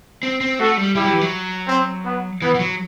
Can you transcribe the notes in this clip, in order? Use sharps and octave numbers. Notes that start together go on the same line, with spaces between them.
C4
C4
A3 F#4 A4
G3
G3 E4 G4
F#3
E3
F#3
C4
B3
E3 B3
E3
F#3